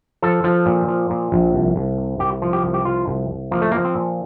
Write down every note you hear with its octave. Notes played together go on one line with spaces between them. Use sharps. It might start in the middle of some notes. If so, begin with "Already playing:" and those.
F3 A4
F3
A#2
F3
A#2
A#1
C2
C2
C3
C2 G4
F3
G4
C2
G4
F3 F4
C2
C2
F3 A#3
A3
F3 A#3
C4
A#2